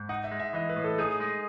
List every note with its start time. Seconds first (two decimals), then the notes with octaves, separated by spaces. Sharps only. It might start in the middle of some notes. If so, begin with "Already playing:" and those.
Already playing: G#2
0.09 D#4 F#5
0.24 E5
0.32 G#3
0.40 E5
0.53 E3 D#5
0.69 B4
0.76 A2
0.84 A4
0.98 D#4 G#4
1.20 G#3